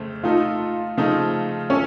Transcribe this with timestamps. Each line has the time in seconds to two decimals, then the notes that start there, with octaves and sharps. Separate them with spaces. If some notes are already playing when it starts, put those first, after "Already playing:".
Already playing: F2 C#3 A3 C4
0.23 A3 D#4 F4 A4
0.98 C#3 F3 A3 D#4
1.70 C#4 A4